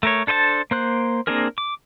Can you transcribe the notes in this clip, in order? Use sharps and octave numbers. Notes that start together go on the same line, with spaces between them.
A3 A#4 C#5
D4 A4 C5 D#5 A5
A#3 C5 F#6
A#3 C4 D4 G#4 A#4
D6